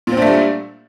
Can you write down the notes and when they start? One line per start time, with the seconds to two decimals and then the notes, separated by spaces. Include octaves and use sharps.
0.07 A#2
0.12 C4
0.17 D4
0.22 A3
0.27 G3